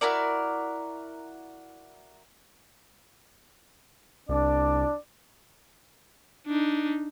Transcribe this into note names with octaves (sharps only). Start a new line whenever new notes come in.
E4 F#4 A#4 D5
C2 D4 D5
D4 D#4